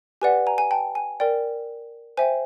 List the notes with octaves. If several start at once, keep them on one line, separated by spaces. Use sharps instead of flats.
G4 B4 D5 F#5 G#5
G#5 A#5
G#5
G5 A5
G#5
A#4 D5 G5
C5 E5 G5 G#5